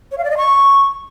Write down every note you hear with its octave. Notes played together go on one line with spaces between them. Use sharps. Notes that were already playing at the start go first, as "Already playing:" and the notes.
C#5
F5
D5
D#5
C#6